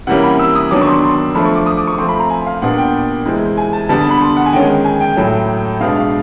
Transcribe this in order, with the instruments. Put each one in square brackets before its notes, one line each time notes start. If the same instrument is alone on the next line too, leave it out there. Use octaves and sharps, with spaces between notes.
[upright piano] C3 E3 G3 A#3 C#4 F#5
B5
E6
D#6
D#3 F#3 B3 D4 D6
C#6
C6
C6
F3 A3 D4 B5
C#6
D6
D#6
D6
C#6
F3 A3 C4 C6
B5
A#5
G#5
F5
A#2 G3 B3 D4 F#5
G5
C3 E3 G#3 C4
G#5
A5
D3 G3 B3 D4 A5
A5
B5
C6
F#5
G#5
D#3 G#3 C#4 G5
G#5
G5
A2 F#3 A3
B2 G#3 B3 D4 F5
F5